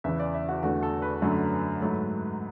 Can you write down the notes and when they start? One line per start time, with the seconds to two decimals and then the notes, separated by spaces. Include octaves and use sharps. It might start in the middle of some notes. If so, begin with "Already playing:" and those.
0.04 E2 C#3 E3 E5
0.20 D5
0.34 E5
0.49 F#4
0.63 E2 D3 A3 F#4
0.83 A4
1.02 B4
1.22 F#2 D3 F#3 A3
1.81 G#2 F#3 A3